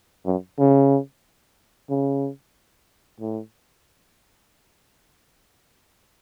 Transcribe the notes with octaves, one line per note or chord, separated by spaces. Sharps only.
F#2
C#3
C#3
A2